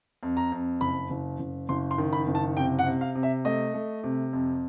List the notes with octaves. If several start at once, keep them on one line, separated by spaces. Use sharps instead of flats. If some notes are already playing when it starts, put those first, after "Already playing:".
F2
A#5
F2
F#1 B5
F#1
F#1
F#1 C6
C6
D#3
B5
F#1
A5
C3 G5
F#5
C3
F5
C3
E5
A3 D#5
A3
C3
F2